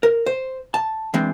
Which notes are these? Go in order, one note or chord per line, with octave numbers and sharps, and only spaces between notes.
A#4
C5
A5
E3 G#3 C4 D4